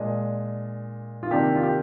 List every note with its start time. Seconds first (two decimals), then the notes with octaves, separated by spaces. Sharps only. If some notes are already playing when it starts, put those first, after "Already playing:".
Already playing: A#2 G#3 D4 D#5
1.23 F4
1.31 C3 D#3 A#3 D4 G4
1.55 F4
1.63 G4